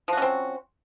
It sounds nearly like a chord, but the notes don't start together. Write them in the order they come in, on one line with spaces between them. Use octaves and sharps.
F3 F#4 C#4 C4